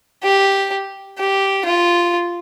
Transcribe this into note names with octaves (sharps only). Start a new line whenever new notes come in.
G4
G4
F4